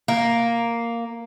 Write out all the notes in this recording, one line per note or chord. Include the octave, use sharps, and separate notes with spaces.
A#3